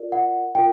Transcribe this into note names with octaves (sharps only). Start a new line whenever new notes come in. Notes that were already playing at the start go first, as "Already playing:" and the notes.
Already playing: F4 A#4 D5
F#5
F4 A#4 G5